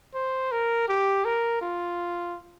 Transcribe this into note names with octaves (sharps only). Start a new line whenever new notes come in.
C5
A#4
G4
A#4
F4